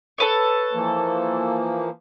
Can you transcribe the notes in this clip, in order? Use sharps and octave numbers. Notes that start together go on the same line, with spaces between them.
A4 B4 C#5
E3 F3 A#3